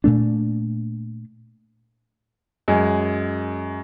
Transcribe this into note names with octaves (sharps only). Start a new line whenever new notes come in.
A#2 A3 D4
F#2 G#3